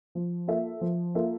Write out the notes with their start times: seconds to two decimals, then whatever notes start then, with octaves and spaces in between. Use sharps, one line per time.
0.15 F3
0.48 A#3 F4 A4 E5
0.81 F3
1.15 A#3 F4 A4 E5